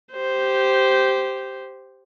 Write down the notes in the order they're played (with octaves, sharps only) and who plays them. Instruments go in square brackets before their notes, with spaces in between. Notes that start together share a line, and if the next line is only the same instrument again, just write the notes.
[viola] G4 C5